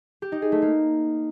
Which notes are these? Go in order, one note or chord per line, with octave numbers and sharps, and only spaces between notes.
G4
D#4
G#4
A3
A#3